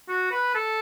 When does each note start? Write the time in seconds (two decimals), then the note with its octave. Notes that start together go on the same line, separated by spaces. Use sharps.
0.09 F#4
0.31 B4
0.55 A4